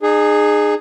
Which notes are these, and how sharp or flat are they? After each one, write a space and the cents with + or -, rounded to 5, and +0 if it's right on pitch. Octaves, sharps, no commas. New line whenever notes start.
D#4 -40 G#4 +0